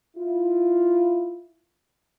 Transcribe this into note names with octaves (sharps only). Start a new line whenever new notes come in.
E4 F4